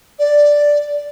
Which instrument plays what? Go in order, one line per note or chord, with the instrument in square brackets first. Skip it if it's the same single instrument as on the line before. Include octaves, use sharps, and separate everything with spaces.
[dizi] D5